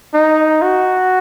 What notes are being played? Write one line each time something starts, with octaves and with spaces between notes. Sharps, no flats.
D#4
F#4